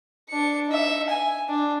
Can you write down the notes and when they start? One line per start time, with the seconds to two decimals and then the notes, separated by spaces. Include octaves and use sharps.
0.29 D4 C#7
0.69 D#4 E5
1.09 G#5
1.49 D4